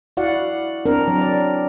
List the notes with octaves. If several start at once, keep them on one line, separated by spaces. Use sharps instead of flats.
E4 F#4 D5 F5 F#5
C4 D4 A#4
F#3
D5